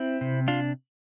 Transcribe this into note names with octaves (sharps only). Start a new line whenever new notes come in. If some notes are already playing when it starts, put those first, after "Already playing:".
Already playing: C4 E4
C3
D4 F4